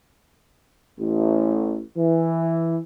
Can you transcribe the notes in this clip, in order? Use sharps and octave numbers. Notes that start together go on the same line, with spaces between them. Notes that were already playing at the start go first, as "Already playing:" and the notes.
A1
E3